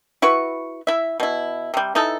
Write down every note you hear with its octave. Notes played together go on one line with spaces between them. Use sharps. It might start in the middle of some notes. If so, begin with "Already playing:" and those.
E4 F#4 B4 C#6
E4 E5
B2 E4
C3 G3
E3 D#4 E4 A4